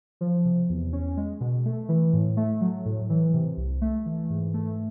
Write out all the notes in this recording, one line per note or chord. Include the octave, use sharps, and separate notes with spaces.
F3
C3
E2
C#4
G#3
B2
A3
E3
A2
A3
F#3
A2
E3
C3
C2
A3
E3
G#2
A3